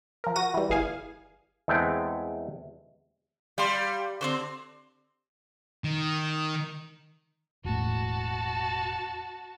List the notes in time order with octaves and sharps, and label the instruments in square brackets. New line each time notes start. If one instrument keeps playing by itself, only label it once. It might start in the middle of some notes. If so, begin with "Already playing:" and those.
[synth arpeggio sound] F3 A#4
F#4 A#6 D#7
E3 G3
G1 E3 G#4 F5 G#5
[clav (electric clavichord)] E2 G#3 A3 C4 G5
[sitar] G3 [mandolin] F5 C6
[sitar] D3 [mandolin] C4 C#4 C5
[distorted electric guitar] D#3
[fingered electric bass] E1 A2 [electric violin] F#4 A5